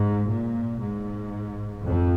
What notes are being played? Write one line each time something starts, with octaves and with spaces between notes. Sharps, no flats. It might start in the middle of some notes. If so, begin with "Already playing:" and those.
Already playing: G#2
A#2
G#2
F2